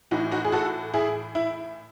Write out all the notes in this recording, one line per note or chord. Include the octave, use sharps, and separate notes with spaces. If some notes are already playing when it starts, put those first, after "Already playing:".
A2 E3 D#4 F#4
D#4 F#4
G#4
F#4 A4
E4 G#4
E4